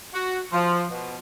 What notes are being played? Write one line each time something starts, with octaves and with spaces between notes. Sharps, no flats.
F#4
F3
B2